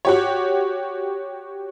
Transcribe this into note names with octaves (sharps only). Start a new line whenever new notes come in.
F#4 G4 C#5